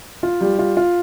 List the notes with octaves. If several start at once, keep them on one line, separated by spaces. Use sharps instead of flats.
F4
G3
F4
F4